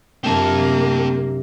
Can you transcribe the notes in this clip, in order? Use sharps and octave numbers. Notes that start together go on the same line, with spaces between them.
F#2 C3 A#3 C4 D4 A5